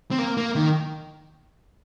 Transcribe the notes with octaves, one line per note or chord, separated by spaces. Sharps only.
C4
A#3
A#3
D#3